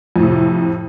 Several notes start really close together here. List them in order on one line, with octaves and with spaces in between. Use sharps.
F2 A2 C3